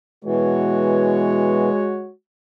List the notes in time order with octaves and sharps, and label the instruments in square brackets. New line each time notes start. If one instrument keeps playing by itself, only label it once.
[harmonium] B2 E3 [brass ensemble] G#3 F#4 C#5